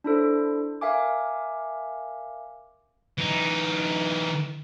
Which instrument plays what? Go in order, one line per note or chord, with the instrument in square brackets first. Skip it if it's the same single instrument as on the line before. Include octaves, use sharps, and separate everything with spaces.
[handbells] D4 E4 A4 C5
A#4 E5 F5 G#5 D6
[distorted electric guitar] E3 D#4